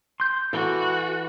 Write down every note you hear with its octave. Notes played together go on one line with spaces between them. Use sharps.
C6 G6
E3 F#4 A4